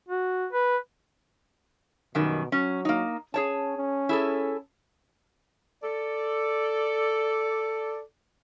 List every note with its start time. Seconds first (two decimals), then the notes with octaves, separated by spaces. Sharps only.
0.09 F#4
0.52 B4
2.15 F#2 B2 D#3 G3
2.52 F#3 C#4
2.85 A#3 D#4
3.34 C#4 G#4 C#5 A5
3.77 C#4
4.09 E4 G#4 A4
5.82 A4 D5